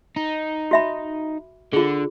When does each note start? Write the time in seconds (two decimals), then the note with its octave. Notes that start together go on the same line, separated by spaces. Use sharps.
0.16 D#4
0.71 F#4 E5 B5
1.73 D3 F4 G#4